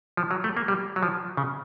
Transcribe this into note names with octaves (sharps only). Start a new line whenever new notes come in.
F3
F#3
A3
A#3
G3
F#3
F3
C#3